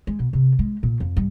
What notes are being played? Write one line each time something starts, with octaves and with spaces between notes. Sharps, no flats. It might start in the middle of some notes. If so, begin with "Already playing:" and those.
G#3
B2
C3
G#3
A#2
F2
G2